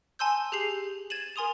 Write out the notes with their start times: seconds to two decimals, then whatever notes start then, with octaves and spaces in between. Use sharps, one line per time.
0.19 G#5 A5 C6 E6 G6
0.52 G4 G#4 G6 C7 F7 F#7
1.10 G#6 A6 D#7 E7 F#7
1.36 A#4 G#5 C6 D#6 F7